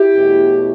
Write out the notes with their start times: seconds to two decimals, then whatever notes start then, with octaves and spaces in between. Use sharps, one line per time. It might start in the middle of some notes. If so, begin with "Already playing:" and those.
Already playing: E4 G4
0.14 E2 B2 A3 C#4